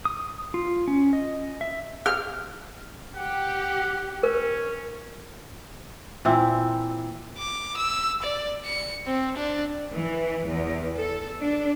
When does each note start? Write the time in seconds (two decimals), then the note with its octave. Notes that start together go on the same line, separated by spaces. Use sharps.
0.05 D#6
0.54 F4
0.88 C#4
1.13 D#5
1.61 E5
2.06 F6
3.16 G4 F#5
4.23 C#4 A#4
6.25 A#2 E3 C4 E4
7.38 D6
7.77 E6
8.22 D5
8.65 C#7
9.07 C4
9.37 D4
9.92 E3
10.47 E2
10.96 A4
11.41 D4